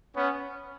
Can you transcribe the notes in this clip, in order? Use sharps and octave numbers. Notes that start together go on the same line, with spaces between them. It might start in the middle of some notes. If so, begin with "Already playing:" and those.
B3 C#4